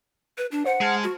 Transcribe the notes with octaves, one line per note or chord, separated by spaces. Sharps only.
B4
D4
C5 F#5
G#3 A5 F6
F#4